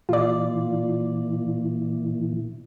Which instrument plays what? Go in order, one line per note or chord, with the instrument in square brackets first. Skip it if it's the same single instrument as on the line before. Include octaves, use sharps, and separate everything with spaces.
[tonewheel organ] A#2 E3 [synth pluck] F4 D5